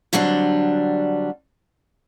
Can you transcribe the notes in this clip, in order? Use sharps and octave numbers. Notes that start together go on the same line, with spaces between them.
D3 F#3 G3 C4 D4